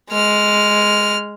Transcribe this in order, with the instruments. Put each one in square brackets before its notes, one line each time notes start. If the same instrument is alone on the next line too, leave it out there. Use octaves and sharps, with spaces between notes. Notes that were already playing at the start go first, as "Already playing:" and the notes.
[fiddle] G#3 F6